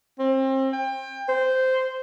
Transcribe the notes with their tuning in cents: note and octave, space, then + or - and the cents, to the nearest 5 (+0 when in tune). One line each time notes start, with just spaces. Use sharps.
C4 +30
G5 +25
C5 -10